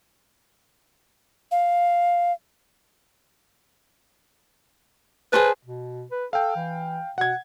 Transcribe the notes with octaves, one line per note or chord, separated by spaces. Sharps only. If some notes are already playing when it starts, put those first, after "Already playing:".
F5
G#4 B4 C5 A5
B2
B4
A4 F5 G5
E3
B2 F#5 G#6